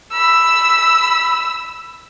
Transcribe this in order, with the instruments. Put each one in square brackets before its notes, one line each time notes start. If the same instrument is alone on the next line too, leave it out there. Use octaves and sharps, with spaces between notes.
[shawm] B5 [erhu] E6